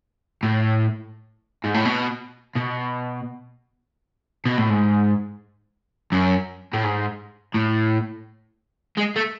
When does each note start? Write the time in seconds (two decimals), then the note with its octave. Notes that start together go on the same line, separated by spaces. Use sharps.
0.43 A2
1.64 G#2
1.74 A2
1.85 B2
2.56 B2
4.45 B2
4.58 A2
4.70 G#2
6.12 F#2
6.73 A2
6.84 G#2
7.54 A2
8.97 G#3
9.16 A3